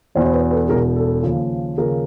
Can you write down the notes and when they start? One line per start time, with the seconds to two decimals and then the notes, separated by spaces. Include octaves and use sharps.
0.15 E1 E2 B2 C5 D5
0.26 C5
0.32 B4 C#5
0.51 A4 B4
0.68 E1 E2 B2 G#4 A#4
0.96 A4
1.23 D#2 C#3 F3
1.78 D#2 C#3 F3 G#4 A#4